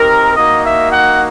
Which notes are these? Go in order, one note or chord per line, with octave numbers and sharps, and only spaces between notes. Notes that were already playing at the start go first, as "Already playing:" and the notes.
Already playing: C4 D#4 G4 A#4
A#3 D#4 F#4 D#5
E5
F#5